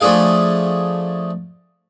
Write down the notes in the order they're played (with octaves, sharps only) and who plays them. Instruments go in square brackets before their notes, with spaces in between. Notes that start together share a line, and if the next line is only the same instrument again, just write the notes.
[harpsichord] F3 A3 D4 G#4 F5